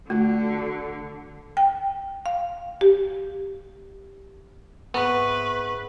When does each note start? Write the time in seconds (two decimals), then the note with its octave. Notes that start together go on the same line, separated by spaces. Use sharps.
0.10 D3 A3 F#4
1.57 G5
2.26 F5
2.81 G4
4.94 G#2 B3 C4 B4 E5 C#6